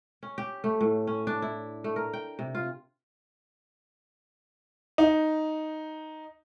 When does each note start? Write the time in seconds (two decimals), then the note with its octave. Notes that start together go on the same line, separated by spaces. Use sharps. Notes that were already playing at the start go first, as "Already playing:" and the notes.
0.23 C#4
0.38 G4
0.64 A3
0.81 A2
1.07 C#4
1.27 D4
1.42 E4
1.84 A3
1.96 A#4
2.13 G5
2.39 C3
2.55 F4
4.98 D#4